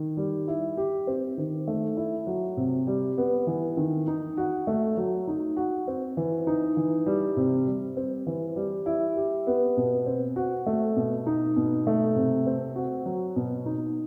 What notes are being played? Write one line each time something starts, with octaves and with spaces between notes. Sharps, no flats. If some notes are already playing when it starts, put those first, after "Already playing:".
Already playing: D#3
G3
E4
G4
C4
D#3
A3
E4
F#3
C3
G3
B3
E3
D#3
D#4
F#4
A3
F#3
D#4
F#4
C4
E3
D#4
E3
G3
C3
G3
C4
E3
G3
E4
G4
B3
B2
C4
F#4
A3
B2
D#4
B2
A3
C3
C4
F#4
F#3
B2
D#4